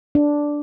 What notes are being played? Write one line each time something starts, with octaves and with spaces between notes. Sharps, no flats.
D4